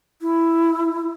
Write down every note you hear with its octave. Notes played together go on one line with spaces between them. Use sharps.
E4